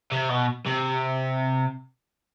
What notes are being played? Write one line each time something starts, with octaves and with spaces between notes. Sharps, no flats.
C3
B2
C3